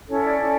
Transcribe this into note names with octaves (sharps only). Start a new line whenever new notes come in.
C#4 E4 A4 C#5
D5
C#4 E4 A4